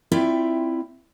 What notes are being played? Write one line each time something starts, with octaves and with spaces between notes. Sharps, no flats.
C4 E4 F4 D5 E5 G5